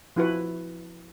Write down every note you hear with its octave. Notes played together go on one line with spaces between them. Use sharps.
F3 E4 F#4 B4